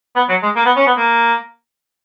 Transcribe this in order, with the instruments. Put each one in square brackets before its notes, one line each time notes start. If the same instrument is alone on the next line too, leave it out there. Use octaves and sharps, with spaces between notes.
[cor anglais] B3
F#3
G#3
A#3
B3
C#4
B3
A#3